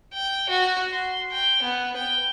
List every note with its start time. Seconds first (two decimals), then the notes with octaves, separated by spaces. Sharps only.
0.14 G5
0.49 F#4
0.92 C6
1.32 G5
1.62 B3
1.97 G5